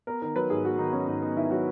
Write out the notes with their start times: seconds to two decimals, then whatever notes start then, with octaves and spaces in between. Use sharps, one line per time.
0.07 B3 A#4
0.22 D#3 A#4
0.36 F#3 B4
0.50 G#2 G#4
0.64 B3 F#4
0.78 D#3 D#4
0.93 F#3 C#4
1.07 G#2 D#4
1.22 B3 D#4
1.37 D#3 E4
1.51 F#3 F#4